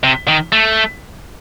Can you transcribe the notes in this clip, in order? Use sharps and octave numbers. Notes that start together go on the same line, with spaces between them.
C3
D#3
A3